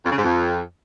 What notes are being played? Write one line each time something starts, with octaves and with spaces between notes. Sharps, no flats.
F2
C#3
G#2
F2